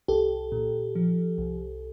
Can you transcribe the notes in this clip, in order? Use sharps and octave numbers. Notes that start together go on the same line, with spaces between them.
C2 G4 A4
A#2
F3
C2